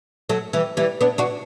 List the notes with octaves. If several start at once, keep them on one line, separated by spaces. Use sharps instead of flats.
F#3 A3
E3 G3
E3 G3
B3 D4
D4 F#4